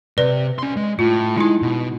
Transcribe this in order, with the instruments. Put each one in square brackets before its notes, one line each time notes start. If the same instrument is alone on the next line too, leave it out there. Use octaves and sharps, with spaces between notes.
[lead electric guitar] C3 [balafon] B4 D5
[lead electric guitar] C#4 C6
G#3
[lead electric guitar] A2 [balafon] F4
[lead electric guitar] G#3 [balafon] D#4 E4
[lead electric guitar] B2